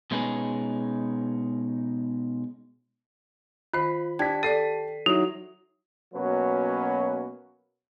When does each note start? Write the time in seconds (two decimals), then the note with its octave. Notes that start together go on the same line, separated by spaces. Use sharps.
0.11 B2 G#3 C#4 D#4 G#4 B4
3.74 D#3 F4 C5 B5
4.19 D4 G4 G5 A5 G#6 B6
4.43 A4 D5 C7 D#7
5.06 F#3 D#4 E4 F#4 E5
6.13 B2 F#3 A#3 C#4 B4